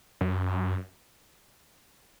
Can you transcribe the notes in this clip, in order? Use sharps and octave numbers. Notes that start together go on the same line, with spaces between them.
F#2